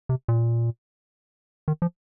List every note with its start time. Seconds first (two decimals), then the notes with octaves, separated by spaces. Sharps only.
0.09 C3
0.28 A#2
1.68 D#3
1.82 F3